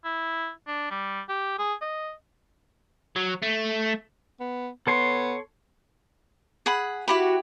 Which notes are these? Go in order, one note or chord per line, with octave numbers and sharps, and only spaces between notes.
E4
D4
G3
G4
G#4
D#5
F#3
A3
B3
B3 A4 C#5 C6
G#4 F#5 B5
E4 F#4 G4 B5